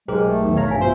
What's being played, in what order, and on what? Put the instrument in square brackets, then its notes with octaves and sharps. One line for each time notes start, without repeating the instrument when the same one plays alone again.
[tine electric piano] B1 G4 A#4 [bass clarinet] G#3 [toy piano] G#4 C5
[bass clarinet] A3
[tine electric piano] B1 E2 D#3
C#5 F5 A#5
[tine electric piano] A#1 G2 [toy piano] F5 G#5
[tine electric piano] B2 F3 E5 [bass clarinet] C5